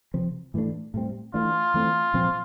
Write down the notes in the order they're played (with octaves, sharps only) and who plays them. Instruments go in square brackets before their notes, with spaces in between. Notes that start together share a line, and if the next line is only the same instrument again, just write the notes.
[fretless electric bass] C3 F3 C4
A2 E3 A3 D4
A2 G3 C4
[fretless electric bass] E3 A3 D4 [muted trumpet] F4
[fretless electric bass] E3 A3 C4
A#2 F3 C4